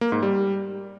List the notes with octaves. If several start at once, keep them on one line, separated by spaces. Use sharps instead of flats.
A#3
G#2
G3